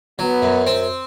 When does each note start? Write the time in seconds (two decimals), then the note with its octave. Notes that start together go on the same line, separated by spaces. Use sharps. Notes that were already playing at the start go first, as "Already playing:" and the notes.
0.19 F#3 B3
0.42 F#2
0.67 C4